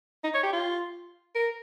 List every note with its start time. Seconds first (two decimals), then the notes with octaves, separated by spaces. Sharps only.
0.24 D#4
0.34 C#5
0.43 G4
0.53 F4
1.35 A#4